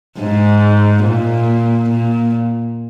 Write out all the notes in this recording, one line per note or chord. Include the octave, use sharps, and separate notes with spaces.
G#2
A#2
A#2